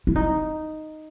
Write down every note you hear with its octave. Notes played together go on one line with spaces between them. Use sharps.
E4
D#4